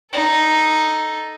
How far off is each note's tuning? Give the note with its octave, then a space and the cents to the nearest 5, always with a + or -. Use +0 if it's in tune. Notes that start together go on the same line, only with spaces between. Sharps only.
D#4 +0 A4 +0